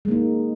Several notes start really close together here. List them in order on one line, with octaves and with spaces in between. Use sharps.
G#3 A#3 D#4